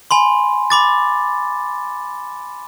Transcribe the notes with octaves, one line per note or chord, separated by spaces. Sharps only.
G#5 B5 C6
B5 D6 A6